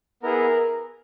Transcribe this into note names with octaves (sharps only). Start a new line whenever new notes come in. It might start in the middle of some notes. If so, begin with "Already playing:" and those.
B3 E4 G#4 A#4